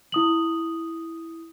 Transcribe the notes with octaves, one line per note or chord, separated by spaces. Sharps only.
E4 D#6 F#7